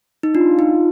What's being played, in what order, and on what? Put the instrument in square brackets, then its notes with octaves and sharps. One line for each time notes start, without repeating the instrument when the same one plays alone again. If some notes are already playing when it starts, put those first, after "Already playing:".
[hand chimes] D#4
[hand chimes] D4 [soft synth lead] F4
[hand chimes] D#4